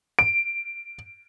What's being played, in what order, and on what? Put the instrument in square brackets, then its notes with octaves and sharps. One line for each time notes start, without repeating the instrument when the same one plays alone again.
[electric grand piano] D7